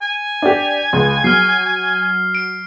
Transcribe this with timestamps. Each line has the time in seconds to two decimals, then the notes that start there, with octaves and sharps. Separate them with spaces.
0.02 G#5
0.42 D4 G4
0.93 C#2
1.24 F#3 F6 C7
2.35 D7